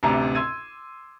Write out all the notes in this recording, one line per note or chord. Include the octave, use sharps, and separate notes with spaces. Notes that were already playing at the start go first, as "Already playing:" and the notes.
A1 D2 C3 A#5 D6
C6 E6 G#6 D#7